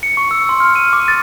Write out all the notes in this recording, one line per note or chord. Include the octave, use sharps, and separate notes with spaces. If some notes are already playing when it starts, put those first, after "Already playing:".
C#7
C#6
E6
C6
F6
D#7
D6
A6